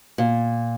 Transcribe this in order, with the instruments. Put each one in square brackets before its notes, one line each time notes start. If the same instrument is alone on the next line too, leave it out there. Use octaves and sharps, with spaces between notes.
[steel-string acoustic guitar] A#2